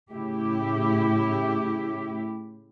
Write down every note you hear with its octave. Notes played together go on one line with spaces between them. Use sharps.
A2 C#3 E4 G4